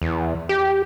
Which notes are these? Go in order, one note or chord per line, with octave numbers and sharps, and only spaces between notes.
E2
G4